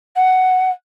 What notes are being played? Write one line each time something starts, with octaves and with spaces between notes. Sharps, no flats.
F#5